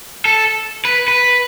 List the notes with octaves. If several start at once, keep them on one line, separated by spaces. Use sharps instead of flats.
A4
B4
B4